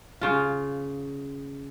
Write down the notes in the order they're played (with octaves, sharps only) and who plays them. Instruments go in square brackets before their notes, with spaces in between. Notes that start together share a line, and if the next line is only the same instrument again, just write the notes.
[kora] C#3 F4